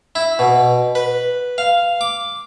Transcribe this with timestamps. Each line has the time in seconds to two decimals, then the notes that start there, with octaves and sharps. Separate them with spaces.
0.15 E4
0.39 B2
0.95 B4
1.58 F5
2.01 D6